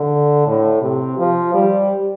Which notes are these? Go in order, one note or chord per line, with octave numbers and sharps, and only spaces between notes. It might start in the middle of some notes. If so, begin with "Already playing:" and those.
Already playing: D3
A2
C3
F3
G3